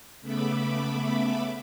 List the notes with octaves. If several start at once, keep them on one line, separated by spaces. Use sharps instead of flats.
C#3 A3 B3 E5 B5 D6